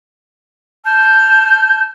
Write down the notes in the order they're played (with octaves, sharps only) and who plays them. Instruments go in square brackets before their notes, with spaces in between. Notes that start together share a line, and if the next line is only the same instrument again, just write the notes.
[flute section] A5 F6 G6